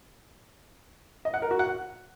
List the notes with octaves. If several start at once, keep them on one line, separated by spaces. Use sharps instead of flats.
D#5
F#5
A#4
F#4
F#5